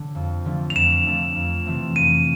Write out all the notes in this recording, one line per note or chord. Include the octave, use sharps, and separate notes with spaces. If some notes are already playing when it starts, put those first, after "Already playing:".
Already playing: D3
F2
D3 F3 A3 D4
F7
F2 E7
D3 F3 A3 D4
F2
C3 E3 A3 C4
F2 D#7